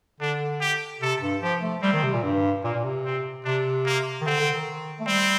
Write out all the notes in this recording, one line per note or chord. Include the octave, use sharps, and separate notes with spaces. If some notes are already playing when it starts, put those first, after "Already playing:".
D3 D4
G4
C3 A4
G2
F3 G4
A3
G3 C4
D#3
C3
A#2
G2
A#2 A#3
A#2
C3
C4
C3 D4
A#3
D#3
D3 C4
D3
D#3
A3
G3 C4